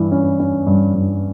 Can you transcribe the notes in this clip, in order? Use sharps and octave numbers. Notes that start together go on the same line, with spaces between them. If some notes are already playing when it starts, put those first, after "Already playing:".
Already playing: G2 E3
C#4
C#4
G2
G2